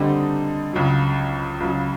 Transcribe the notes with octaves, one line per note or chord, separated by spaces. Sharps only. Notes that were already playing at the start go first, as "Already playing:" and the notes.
Already playing: D3 G3 C4 D#4
C#2 C#3 F#3
C#2 C#3 F#3